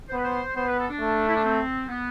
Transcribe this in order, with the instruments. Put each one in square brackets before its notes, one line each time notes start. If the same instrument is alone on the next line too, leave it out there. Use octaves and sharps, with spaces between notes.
[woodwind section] C5
[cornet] B3 [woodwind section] B4
[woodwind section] C5
[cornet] B3 [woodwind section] C5
[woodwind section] B4
A4
D4
[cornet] A3
[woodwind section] E4
D4
C4
B3